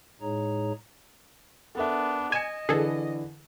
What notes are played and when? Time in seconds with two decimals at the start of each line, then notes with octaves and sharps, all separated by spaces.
0.21 A2 G#3 D#4 G#4 C#5 A#5
1.75 B3 D4 A4 A#4 E5
2.32 D#5 G#5 C#7 E7
2.69 D3 E3 G#4 A4 B4